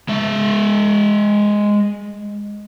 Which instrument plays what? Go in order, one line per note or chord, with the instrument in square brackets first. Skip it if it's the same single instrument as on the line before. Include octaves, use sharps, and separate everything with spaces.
[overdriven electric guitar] G#3 E5